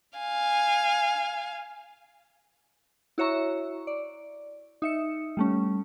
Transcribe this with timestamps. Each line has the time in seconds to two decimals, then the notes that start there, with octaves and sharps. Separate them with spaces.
0.18 F5 G#5
3.18 E4 F#4 C#5 E5 A#5 C#6
3.87 D5
4.82 D#4 E5 C#7
5.37 G3 A3 C#4